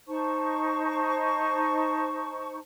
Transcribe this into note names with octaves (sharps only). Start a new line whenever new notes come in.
D#4 C5 A5 C#6